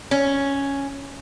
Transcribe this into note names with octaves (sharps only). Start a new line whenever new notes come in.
C#4